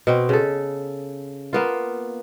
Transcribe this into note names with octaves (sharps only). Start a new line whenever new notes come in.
B2 C4
C#3 A4
A#3 B3 F4